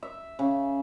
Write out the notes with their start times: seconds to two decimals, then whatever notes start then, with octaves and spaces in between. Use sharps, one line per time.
0.03 E5
0.39 C#3